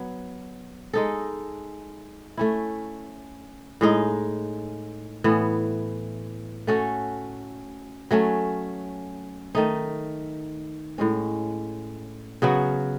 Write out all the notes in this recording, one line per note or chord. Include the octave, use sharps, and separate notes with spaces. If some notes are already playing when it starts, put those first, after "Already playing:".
Already playing: F#3 B3
G#3 D#4 A4
A3 C#4 E4
A2 G#3 D#4
A2 E3 B3
A3 C#4 F#4 A4
F#3 A3 C#4
D#3 A3 D#4
A2 G#3 C#4
C#3 F#3 B3 F#4